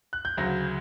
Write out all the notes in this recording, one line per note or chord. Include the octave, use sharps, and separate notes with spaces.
F#6
G6
D2 C#3 F#3 A#6